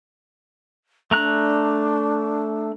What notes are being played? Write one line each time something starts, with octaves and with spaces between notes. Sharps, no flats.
A3 D4 A#5 F#6